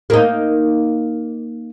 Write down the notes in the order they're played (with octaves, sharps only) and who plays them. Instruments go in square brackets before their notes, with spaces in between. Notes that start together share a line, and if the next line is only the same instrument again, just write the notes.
[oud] A#3 D#4